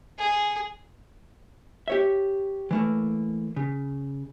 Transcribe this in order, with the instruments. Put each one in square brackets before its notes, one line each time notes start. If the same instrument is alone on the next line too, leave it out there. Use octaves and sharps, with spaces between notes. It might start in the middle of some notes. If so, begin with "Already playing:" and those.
[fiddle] G#4
[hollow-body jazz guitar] G4 C#5 E5
E3 A3 A#3
C#3